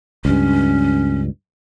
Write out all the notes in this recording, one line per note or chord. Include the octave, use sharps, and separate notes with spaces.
C#2 G2 C#4